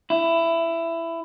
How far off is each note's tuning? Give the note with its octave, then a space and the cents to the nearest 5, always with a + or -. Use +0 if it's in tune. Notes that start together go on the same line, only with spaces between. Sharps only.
E4 +15